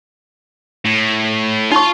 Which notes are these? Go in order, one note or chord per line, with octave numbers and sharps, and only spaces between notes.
A2
D#4 F4 C6 C#6